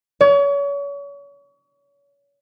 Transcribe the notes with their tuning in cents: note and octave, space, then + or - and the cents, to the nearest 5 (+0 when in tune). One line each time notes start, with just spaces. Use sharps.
C#5 +35